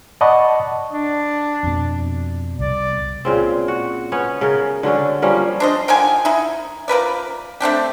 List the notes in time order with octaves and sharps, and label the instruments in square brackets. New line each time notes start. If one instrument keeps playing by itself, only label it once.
[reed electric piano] D5 D#5 F#5 A5 B5 C#6
[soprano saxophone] D4
[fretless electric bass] F2 B2
[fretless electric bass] C2 [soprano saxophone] D5
[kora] A#2 C#3 C4
F#4
B3 C#4 C#5
C#3 A#4
D3 F#3 C#4 D4
F3 G3 A#3 C#4
[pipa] D4 C5 D#5
D3 D#3 F3 G#5
D#4 E4
F3 A#4 B4 D5
A3 C4 D4 G4